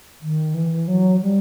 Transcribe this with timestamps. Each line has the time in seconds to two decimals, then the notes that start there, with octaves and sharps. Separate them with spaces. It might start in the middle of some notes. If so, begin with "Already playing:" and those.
0.21 D#3
0.54 E3
0.88 F#3
1.21 G3